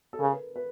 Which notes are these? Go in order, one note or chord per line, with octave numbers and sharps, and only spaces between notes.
A4
C#3 A#4
B4
B4